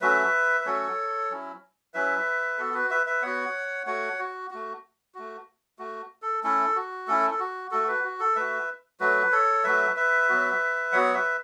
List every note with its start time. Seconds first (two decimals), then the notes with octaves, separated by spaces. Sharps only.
0.01 F#3 A3 C#4 F#4 B4 E5
0.60 B4
0.65 F#3 A3 C#4 F#4 A4 C#5
1.30 F#3 C#4 E4
1.94 F#3 C#4 E4 B4 E5
2.58 B3 F#4 A4
2.74 F#4 B4
2.90 B4 E5
3.06 B4 E5
3.22 B3 F#4 C#5 F#5
3.86 A3 F#4 C#5 F#5
4.19 F#4
4.51 A3 F#4
5.15 A3 F#4
5.79 A3 F#4
6.22 A4
6.43 A3 C#4 E4 A4
6.76 F#4
7.08 A3 C#4 E4 A4
7.30 A4
7.40 F#4
7.71 A3 F#4 A4
7.88 F#4 B4
8.04 F#4
8.20 A4
8.36 A3 F#4 B4 E5
9.00 F#3 A3 F#4 B4
9.32 A4 C#5
9.64 F#3 A3 F#4 B4 E5
9.96 B4 E5
10.29 F#3 B3 F#4
10.92 F#3 B3 F#4 C#5 F#5
11.14 B4 E5